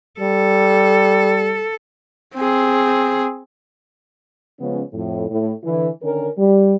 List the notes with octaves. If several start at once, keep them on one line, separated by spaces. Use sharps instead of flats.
G3 A4
C4 G#4
C#3 F3 G#3 B3 C#4
F2 A2
A2
D3 E3
D3 D#3 C#4 A#4
G3